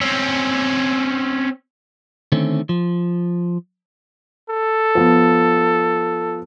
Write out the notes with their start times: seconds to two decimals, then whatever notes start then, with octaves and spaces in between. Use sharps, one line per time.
0.01 C4 C#4
2.32 D3 D#3 A3 C4 C#4
2.69 F3
4.50 A4
4.95 F3 B3